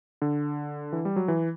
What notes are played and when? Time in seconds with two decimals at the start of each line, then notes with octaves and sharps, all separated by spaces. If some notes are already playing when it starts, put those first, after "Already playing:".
0.22 D3
0.92 E3
1.05 G3
1.16 F#3
1.28 E3